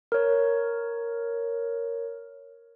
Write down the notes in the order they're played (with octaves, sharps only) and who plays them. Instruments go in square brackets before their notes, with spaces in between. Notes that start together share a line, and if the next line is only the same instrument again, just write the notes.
[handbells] A#4 C#5